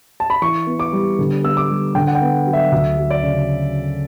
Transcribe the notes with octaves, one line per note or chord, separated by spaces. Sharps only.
A5
B5
E3 C#6
B3
D6
G3
D3
B3 E6
D6
G3
D3 G5
F#5
G5
B3
F#3
E5
D2 E5
F#3
D5
C#3